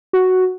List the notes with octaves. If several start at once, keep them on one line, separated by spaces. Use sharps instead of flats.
F#4